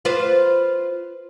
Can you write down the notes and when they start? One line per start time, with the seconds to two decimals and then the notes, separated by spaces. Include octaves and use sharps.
0.05 F4 B4 C5